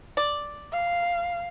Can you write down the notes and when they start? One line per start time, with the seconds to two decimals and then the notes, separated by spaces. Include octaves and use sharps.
0.17 D5
0.73 F5